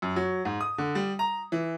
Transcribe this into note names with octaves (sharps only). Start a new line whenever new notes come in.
F#2
F#3
G#2
D#6
D3
G3
A#5
E3